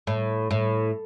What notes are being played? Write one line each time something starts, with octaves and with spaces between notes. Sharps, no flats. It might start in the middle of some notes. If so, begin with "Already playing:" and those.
A2
A2